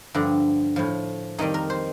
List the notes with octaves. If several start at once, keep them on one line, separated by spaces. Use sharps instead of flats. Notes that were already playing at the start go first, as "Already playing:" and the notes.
G2 D3 F3
A2 F3
F2 D#3 G3 D#4
A#4
C5